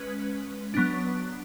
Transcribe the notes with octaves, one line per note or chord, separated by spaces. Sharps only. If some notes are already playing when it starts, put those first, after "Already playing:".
Already playing: G#3 C#4 B4
F#3 B3 D4